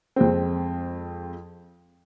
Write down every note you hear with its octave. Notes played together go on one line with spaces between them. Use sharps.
F2 G#3 C4